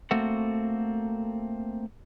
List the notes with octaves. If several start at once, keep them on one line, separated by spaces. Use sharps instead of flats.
A3 A#3 C4 F#4 A4 F#5